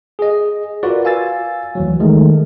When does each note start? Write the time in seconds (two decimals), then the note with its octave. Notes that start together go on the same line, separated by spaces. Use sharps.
0.19 G#4 D#5
0.83 F4 F#4 A#4 B4 D5
1.05 F5 G#5 E6 A6
1.75 D2 E3 F#3
2.00 D#3 G#3 A3